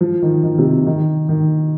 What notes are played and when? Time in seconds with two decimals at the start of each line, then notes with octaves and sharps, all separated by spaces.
0.01 F3
0.22 D#3
0.43 D#3
0.58 C3
0.86 D#3
1.29 D#3